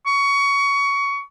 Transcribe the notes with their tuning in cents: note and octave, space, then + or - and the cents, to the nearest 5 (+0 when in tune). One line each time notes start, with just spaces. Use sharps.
C#6 +20